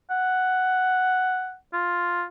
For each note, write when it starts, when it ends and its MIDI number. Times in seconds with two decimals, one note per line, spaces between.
0.10 1.55 78
1.73 2.24 65